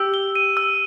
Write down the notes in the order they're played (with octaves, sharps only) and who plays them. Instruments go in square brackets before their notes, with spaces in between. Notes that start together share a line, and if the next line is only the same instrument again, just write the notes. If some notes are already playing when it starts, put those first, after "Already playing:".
Already playing: [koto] G4 [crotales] E6
[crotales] G7
D#7
E6